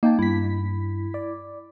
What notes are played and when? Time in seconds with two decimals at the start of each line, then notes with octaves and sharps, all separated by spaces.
0.03 A#3 D#4 G5 A5
0.19 G2 E4 B6
1.14 D5